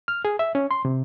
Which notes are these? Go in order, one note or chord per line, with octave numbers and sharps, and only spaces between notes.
F6
G#4
E5
C#4
C6
C3